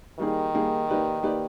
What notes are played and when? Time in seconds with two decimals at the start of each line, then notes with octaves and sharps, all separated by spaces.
0.20 D#3 G3 A#3 D#4 G#4
0.54 G3 A#3 D#4 G#4
0.88 A#3 D#4 G4 B4 D5
1.23 A#3 D#4 G4 B4 D5